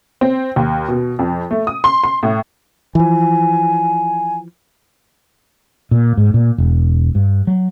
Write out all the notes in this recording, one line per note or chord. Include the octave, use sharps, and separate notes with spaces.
C4
D#2
B2
F2
A3
D#6
C6
C6
A2
E3 F3 G#5
A#2
G#2
A#2
E1
G2
F#3